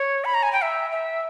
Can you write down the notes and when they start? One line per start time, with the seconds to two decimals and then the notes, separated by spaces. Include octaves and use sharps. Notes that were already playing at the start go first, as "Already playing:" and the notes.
Already playing: C#5
0.25 B5
0.34 A#5
0.43 G#5
0.53 G5
0.62 E5
0.91 E5